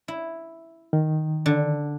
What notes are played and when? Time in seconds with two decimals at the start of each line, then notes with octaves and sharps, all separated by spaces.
0.08 E4
0.93 D#3
1.46 D3